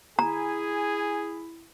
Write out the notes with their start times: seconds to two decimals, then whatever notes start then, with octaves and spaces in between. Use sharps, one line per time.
0.19 E4 G#4 G#5 A#5